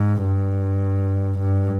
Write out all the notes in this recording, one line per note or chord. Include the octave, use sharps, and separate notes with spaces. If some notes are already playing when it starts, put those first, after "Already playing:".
Already playing: G#2
G2
G2